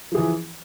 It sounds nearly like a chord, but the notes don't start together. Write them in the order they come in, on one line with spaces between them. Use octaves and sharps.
F3 G#4 E3